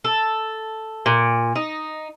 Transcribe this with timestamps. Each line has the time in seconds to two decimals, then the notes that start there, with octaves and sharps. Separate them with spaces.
0.04 A4
1.06 A#2
1.56 D#4